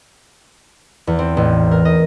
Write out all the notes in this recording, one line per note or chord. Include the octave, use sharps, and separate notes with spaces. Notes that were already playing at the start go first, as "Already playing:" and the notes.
E2
C4
A1
A#4
D#5